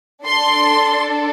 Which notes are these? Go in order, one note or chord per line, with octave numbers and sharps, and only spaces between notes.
D4 A4 C6